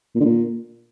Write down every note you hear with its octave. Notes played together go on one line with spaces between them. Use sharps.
A#2
D3
A#2